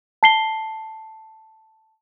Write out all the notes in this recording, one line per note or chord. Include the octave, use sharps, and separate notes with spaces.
A5 C7 G7